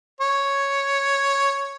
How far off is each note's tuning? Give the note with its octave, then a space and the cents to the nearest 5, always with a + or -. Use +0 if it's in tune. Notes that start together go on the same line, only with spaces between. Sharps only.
C#5 +0